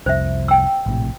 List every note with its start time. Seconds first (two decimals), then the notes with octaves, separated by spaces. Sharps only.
0.06 C2 F2 C5 E5
0.48 G5 E6
0.86 A#1 A2 C3